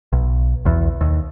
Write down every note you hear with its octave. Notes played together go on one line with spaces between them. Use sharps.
B1
B1 E2
D#2